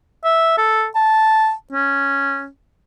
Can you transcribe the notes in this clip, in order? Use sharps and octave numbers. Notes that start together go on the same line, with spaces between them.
E5
A4
A5
C#4